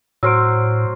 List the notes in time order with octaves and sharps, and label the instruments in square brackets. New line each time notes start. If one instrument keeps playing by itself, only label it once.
[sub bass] A2 [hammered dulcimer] F#3 C5 [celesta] E6 F6 D7